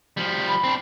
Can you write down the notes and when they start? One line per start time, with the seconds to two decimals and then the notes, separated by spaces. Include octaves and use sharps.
0.17 F3 G3
0.48 B5
0.64 C4 D4